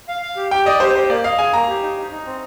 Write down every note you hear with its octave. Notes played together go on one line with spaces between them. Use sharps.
F5
F5
G4
G4 G5
D5 D#5
G4 C5
G4 C5
A#3 D5
D#5 F5
G#4 G#5
A#3 A#5
G4
D#4
D#4
D#4
C4